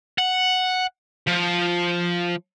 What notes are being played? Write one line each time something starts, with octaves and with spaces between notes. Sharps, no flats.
F#5
F3